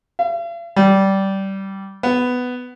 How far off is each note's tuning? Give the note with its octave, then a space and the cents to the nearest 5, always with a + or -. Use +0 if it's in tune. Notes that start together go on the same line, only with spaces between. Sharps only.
F5 -45
G3 -15
B3 +10